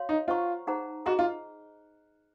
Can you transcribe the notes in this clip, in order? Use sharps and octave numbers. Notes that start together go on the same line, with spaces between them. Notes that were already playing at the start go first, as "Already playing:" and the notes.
Already playing: F#4 C#5 F5 C6
D#4
F4 C5 F#5 A#5 C#6
D#4 G#4 C5 F#5 A#5
F#4 G#4 D#5 A#5
F4